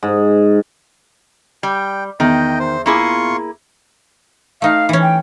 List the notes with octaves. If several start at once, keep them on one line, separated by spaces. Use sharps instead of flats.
G#2
G3 G5
E2 D#3 D#5 G5
C5
A#3 E4 F4 G#4 C6 C#6
A3 D#4 F5
E3 C#4
G5